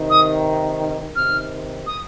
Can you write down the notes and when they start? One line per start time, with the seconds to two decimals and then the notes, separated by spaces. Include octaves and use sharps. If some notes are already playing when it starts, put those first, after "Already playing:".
Already playing: C3 D#3
0.10 D#6
1.16 C3 D#3 F6
1.86 D#6